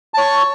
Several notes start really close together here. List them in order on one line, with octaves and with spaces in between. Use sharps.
A5 C#5 C#6